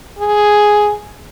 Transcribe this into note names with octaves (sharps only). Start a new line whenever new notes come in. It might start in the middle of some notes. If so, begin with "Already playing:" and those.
G#4